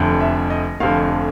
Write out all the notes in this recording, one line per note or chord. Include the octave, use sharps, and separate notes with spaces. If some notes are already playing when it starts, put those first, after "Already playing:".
Already playing: F1 F2 D3
E5
D#5
F1 F2 D3 F5